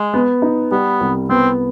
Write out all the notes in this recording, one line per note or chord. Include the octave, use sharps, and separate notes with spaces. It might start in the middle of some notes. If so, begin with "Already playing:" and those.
Already playing: G#3
B3
D#4
G3 B3
C2
B3 C4